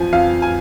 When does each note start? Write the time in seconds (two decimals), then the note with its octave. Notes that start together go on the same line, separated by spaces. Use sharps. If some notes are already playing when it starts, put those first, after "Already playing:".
Already playing: F2 F3 G#5
0.13 F2 F5
0.42 G#5